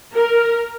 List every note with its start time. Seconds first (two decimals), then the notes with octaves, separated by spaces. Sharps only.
0.14 A#4